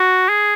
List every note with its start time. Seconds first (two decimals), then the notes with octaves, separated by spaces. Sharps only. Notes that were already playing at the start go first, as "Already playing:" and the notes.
Already playing: F#4
0.29 G#4